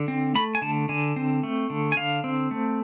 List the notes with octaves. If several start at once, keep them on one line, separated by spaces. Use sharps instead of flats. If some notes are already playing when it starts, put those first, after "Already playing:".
Already playing: D3
C4
A3 B5
G#5
D3 A5
D3 G#5
C4
A3
D3
G#5
D3 F5
C4
A3